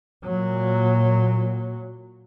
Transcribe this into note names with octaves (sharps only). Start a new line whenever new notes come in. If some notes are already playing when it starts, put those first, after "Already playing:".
A#2 F#3